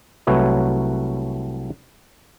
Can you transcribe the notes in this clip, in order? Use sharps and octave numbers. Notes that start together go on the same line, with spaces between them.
C2 F#3 A3 B4 C#5